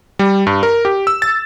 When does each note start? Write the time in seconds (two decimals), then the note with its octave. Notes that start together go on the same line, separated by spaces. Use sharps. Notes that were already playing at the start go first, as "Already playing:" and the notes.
0.19 G3
0.47 G2
0.63 A#4
0.85 G4
1.07 E6
1.22 A6